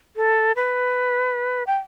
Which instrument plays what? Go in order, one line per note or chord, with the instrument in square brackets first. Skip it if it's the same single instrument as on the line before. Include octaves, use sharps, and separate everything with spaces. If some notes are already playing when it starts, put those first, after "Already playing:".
[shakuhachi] A4
B4
G5